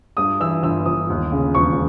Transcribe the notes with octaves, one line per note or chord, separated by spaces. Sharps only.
G2 D#6
E3 E6
G1 E6
G1 D#6
D#2
C#3
E1 C#6